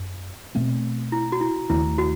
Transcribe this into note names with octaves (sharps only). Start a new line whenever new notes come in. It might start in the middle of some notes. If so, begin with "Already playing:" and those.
Already playing: F#2
B2 A3 C4
E4
F#4
E4
D#2 D#3 A3 E4
F#4